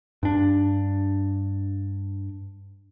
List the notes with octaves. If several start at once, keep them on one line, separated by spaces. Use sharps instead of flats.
G2 D4